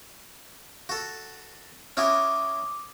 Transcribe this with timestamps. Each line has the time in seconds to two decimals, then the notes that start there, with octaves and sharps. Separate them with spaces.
0.89 F#4 A4
1.97 C#4 E4 F#4 D6 D#6 F6